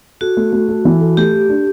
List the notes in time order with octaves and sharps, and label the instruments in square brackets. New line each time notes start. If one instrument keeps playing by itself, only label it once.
[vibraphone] F#4 [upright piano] A4
[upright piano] A3
A3
A4
E3
A4
[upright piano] A3 [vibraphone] G4
[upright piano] A4
D4